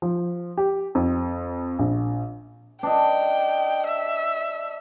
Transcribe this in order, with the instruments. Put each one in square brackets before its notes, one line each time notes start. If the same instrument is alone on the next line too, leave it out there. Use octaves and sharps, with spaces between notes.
[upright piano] F3
G4
F2
A#1
[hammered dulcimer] D4 D5 D#5 [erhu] G5
[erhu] E5